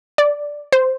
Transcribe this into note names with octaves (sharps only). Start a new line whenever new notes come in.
D5
C5